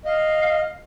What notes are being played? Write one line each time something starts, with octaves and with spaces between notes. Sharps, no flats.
D#5 F5